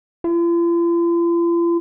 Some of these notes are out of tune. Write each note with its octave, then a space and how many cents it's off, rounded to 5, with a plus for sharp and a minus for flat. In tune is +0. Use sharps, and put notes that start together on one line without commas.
F4 -45